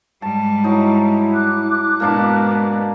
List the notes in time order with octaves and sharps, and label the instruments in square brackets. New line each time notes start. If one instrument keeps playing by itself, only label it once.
[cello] G#2 G3 [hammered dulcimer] A5
[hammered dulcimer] F#3 D#4 [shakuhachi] E4
[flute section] D6 F#6
[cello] G#2 B2 [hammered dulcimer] A#3 D4 A5